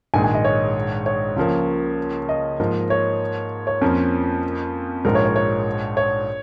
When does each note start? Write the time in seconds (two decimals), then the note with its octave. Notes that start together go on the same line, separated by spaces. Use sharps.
0.14 A#1 G#2 D#3 G#3 G#5
0.24 G#5
0.35 D#5
0.44 C#5
1.06 C#5
1.36 C#2 C#3 F3 A#3
2.29 D#5
2.60 G#2 F3 A#3
2.90 C#5
3.67 C#5
3.81 F2 F3 A#3 C#4 A#4
5.05 A#1 G#2 F3 G#3 A#4
5.15 C#5
5.25 C#5
5.36 C#5
5.97 C#5